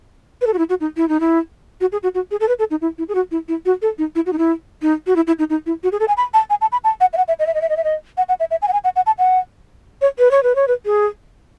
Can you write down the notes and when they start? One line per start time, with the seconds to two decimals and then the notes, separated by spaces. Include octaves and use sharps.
0.41 B4
0.47 A4
0.54 F#4
0.58 E4
0.69 F#4
0.80 D#4
0.97 E4
1.09 D#4
1.20 E4
1.81 F#4
1.92 G#4
2.03 F#4
2.14 F#4
2.31 G#4
2.40 A4
2.48 B4
2.59 A4
2.71 D#4
2.81 E4
2.98 E4
3.09 G#4
3.15 F#4
3.31 E4
3.48 E4
3.65 F#4
3.82 A4
3.98 D#4
4.15 E4
4.26 F#4
4.33 D#4
4.38 E4
4.82 D#4
5.07 F#4
5.16 E4
5.27 E4
5.39 D#4
5.50 D#4
5.66 E4
5.83 F#4
5.92 G#4
6.00 A4
6.08 G#5
6.17 B5
6.34 A5
6.50 G#5
6.61 A5
6.72 B5
6.84 A5
7.01 F#5
7.13 E5
7.17 F#5
7.28 E5
7.39 D#5
7.47 E5
7.54 D#5
7.62 E5
7.69 D#5
7.77 E5
7.84 D#5
8.17 F#5
8.29 F#5
8.40 E5
8.51 E5
8.62 G#5
8.68 F#5
8.73 G#5
8.84 F#5
8.96 F#5
9.06 A5
9.19 F#5
10.02 C#5
10.19 B4
10.31 C#5
10.43 B4
10.56 C#5
10.68 B4
10.86 G#4